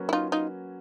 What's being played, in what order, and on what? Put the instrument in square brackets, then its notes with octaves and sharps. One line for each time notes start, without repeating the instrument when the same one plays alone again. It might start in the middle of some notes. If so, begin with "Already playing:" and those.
Already playing: [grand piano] F#3 A#3 C#4 F#4 B4
[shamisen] E4
D#4 F4
D#4 F4